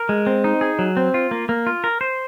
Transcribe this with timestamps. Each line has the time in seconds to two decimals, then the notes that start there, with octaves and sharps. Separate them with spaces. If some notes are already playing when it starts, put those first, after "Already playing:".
Already playing: A#4
0.09 G#3
0.27 C4
0.44 D#4
0.61 G#4
0.79 F#3
0.97 C4
1.14 F4
1.31 A#3
1.49 A#3
1.67 F4
1.84 A#4
2.01 C5